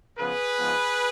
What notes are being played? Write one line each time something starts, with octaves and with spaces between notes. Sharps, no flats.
C#3 F3 B3 G#4 B4
G#2 F3 G#3 B3